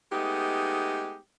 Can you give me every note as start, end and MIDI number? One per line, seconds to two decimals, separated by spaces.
0.12 1.17 56
0.12 1.17 57
0.12 1.17 59
0.12 1.17 63
0.12 1.17 67